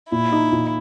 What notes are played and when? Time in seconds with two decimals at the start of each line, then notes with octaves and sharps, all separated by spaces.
0.12 A#2 E4
0.32 D#4
0.52 A#2